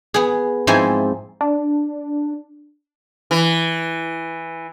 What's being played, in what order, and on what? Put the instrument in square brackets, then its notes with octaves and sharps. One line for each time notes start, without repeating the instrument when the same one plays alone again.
[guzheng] B3 G#4
G#2 F3 C4 E4 C5 G#5
[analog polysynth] D4
[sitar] E3